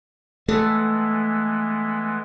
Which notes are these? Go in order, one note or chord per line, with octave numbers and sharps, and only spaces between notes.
E3 G#3 A3 B3 A4